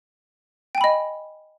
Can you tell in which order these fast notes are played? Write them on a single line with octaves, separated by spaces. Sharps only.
G5 G#5 B5 D#5